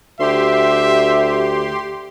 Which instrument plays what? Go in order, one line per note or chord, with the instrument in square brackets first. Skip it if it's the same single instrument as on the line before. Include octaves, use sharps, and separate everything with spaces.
[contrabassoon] D2 [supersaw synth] G4 C6 [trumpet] E5